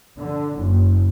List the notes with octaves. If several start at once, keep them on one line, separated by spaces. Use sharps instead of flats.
D3
F#1